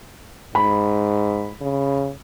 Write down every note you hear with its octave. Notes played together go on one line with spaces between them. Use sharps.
G#2 B5
C#3